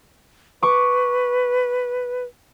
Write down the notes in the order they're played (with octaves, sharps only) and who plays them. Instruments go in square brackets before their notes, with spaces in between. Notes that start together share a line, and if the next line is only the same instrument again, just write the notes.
[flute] B4 [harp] C#6 D6